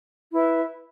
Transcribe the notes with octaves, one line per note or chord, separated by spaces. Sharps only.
E4 B4 E5